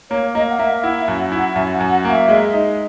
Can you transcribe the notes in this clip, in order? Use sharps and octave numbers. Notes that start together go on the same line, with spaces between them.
A#3 C#5
A#3 D#5
F#5
A#3 E5
E4 F#5
E5
F#2
F#5
E4
F#5
F#2 E5
F#5
F#2
F#5
A#3
E5
G#3
D#4